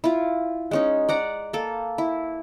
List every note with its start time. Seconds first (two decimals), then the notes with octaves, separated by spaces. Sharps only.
0.04 E4 F4
0.71 G#3 C#4 D#4
1.09 D5 F#5 A#5
1.53 A#3 A4
1.98 E4